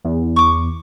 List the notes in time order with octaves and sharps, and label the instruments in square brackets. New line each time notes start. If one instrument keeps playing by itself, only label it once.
[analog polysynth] E2
[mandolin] C#6 D6